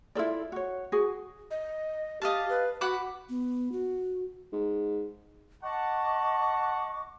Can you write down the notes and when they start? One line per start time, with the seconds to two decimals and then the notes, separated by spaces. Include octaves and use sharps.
0.15 E4 F4 A4 D5
0.52 F#4 C#5
0.92 F#4 G#4
1.51 D#5
2.22 G4 D#5 F5 A5
2.49 B4
2.81 F#4 F#5 B5 D6
3.29 B3
3.72 F#4
4.53 G#2
5.64 D#5 F#5 A5 C#6 D6